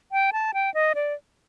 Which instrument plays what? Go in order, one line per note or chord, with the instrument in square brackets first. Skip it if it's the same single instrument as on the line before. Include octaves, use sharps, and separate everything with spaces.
[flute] G5
A5
G5
D#5
D5